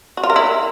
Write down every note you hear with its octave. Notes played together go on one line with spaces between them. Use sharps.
F#4
F4
A#4
E4